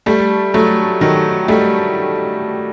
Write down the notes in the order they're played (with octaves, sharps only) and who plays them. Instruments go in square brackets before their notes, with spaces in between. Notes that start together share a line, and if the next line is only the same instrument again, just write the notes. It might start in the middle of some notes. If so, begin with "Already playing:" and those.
[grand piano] G3 [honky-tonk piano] A3
[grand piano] F#3 [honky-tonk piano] A3
[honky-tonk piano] D#3 [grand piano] F#3
[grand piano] G3 [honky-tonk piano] A3